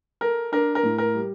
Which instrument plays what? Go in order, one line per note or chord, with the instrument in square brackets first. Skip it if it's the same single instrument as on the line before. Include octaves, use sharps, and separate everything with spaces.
[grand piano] A4 [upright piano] A#4
[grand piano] D4 [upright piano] A#4
[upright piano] A#4
[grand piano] A2
[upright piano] A#4
[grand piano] G3